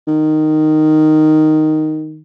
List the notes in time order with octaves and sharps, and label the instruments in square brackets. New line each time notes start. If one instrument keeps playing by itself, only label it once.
[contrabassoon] D#3